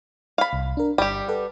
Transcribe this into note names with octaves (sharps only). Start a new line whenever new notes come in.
F5 B5
C2
D4 A#4
G1 G3 G4
A4 B4 F#5